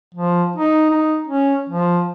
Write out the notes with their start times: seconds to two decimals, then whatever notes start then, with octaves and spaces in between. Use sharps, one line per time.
0.14 F3
0.56 D#4
0.90 D#4
1.27 C#4
1.70 F3